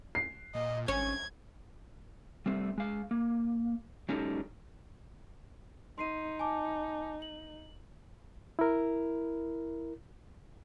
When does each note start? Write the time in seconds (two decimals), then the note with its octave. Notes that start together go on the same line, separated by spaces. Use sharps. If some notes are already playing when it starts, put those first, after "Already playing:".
0.15 C7
0.55 A#2 D#5
0.88 G#1 C#4 G#6
2.46 G3 A3 C4
2.78 G#3 F5
3.11 A#3
4.09 F#3 G#3 C#4 D#4 G4 A4
5.98 D#4 C6 C7 D#7
6.39 G#5 A5 D6
7.22 F#7
8.59 E4 A#4